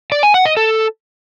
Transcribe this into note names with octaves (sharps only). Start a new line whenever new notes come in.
D5
G#5
F#5
D#5
A4